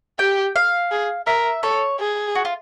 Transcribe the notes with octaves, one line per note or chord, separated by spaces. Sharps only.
G4 G5
F5
G#4
A#4 E5
A4 C#5
G#4
F#4
F4